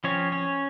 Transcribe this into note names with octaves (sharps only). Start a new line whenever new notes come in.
F3 C4 C#4 C#5
C#4 C#5